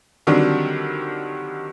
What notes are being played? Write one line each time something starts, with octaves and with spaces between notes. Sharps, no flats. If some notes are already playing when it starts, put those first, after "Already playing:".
D3 D#3 F#3 G3 C4 D4